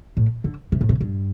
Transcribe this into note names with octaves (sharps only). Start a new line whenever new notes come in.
A2
D3
C3
A2
C3
G2